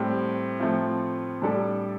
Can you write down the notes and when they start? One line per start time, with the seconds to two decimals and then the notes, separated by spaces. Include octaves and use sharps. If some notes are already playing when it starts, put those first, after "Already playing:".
Already playing: A2 G3 C4 G4
0.60 A2 F3 A3 C4 F4
1.42 A2 G3 D4 A4